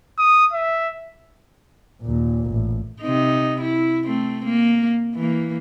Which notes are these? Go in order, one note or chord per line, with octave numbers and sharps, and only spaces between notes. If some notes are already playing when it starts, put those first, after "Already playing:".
D#6
E5
D#2 A#2
A1
C3 D#4
E4
A3 C4
A#3
E3 A#3